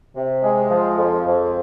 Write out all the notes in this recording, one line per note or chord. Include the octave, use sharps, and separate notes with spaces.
C3
G#3
F3
F2
F2